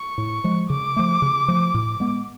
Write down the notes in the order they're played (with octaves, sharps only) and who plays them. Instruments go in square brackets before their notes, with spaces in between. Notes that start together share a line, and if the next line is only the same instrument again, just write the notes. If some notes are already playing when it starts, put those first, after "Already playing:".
Already playing: [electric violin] C#6
[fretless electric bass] A2
F3 G#3
[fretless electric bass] C#3 [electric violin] D6
[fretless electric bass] F3 A3
C#3
F3 A3
A2
G#3 B3